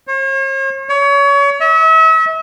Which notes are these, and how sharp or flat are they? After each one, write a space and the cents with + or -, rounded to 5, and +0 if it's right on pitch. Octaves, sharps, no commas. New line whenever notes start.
C#5 -45
C#5 +30
E5 -40